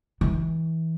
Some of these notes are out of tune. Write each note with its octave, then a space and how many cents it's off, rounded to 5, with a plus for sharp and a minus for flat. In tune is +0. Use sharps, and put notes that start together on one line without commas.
E3 -25